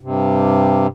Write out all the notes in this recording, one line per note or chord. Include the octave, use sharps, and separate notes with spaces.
G2 C3